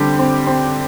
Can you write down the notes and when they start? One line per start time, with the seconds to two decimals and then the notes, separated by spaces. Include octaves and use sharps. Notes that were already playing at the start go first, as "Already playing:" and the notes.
Already playing: D3 G3 C4 G4
0.19 C4
0.47 C4